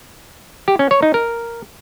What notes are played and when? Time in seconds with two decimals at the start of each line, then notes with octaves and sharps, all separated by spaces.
0.68 G4
0.79 C#4
0.91 C#5
1.02 D#4
1.14 A#4